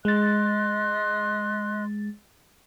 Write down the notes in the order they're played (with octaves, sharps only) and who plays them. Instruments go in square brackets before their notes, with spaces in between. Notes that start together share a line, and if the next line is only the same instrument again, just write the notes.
[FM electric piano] G#3 A6 [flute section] D#5 C6 F#6